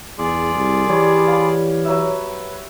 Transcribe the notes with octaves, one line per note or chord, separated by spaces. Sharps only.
E2 F4 G#4 D5
C2
E3 G3 C#5
F5 B5
F#3 B4 E5